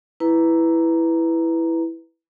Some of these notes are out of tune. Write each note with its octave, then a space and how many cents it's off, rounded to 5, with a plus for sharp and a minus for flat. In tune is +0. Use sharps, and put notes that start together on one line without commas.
E4 +0 B4 +0 A#5 +0